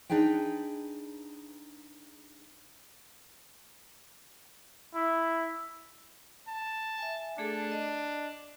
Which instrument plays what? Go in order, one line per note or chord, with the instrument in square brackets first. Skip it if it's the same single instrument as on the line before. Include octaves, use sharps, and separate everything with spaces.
[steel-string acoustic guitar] D4 D#4 G#4 B4 G5
[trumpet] E4
[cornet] A5
[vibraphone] E5 G#5
[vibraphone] A3 G#4 A4 [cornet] D4
[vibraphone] D#5